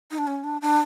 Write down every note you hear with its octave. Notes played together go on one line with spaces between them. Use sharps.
D#4
D4
C#4
D4
D4